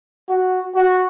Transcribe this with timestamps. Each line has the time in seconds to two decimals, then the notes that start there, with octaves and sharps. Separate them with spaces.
0.29 F#4
0.75 F#4